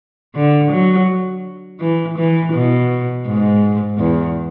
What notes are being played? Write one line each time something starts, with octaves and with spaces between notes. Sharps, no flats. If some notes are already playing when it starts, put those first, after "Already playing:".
D3
F#3
E3
E3
B2
G#2
E2